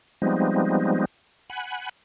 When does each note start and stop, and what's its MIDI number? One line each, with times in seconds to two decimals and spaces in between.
0.22 1.05 53
0.22 1.05 55
0.22 1.05 56
0.22 1.05 59
0.22 1.05 60
0.22 1.05 63
1.50 1.89 78
1.50 1.89 80
1.50 1.89 83
1.50 1.89 90